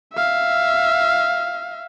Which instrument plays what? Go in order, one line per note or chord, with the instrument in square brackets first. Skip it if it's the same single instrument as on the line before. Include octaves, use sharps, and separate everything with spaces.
[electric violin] E5 F5